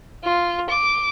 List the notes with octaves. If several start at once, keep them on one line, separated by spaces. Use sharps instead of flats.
F4
D6